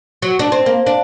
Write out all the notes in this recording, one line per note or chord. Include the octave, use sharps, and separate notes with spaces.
F#3
D4
C4
A#3
D4